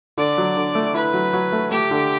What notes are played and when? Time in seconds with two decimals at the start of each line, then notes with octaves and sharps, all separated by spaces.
0.18 D3 D5
0.38 F#3
0.57 D3
0.75 A3
0.94 E4 B4
1.14 F#3
1.33 F#3
1.52 A3
1.71 A3 G4
1.91 D3